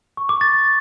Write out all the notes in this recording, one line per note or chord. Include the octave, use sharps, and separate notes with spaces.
C#6
D6
A6